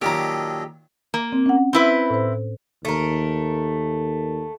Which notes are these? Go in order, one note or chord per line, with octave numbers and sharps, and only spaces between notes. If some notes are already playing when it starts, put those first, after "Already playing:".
A#2 D#3 F#3 G4 A4 D#5 A#5
A#3
C4
C#4 F#5
C4 E4 B4
A2 C5
D#2 A3 A#4